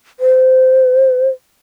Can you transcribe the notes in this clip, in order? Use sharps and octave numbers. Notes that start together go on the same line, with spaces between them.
C5